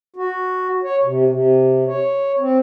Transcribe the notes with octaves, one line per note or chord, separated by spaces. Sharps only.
F#4
C#5
C3
C3
C#5
C4